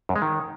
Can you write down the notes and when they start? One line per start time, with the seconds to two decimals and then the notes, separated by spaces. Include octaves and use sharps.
0.09 F#2
0.16 G#3
0.22 D#3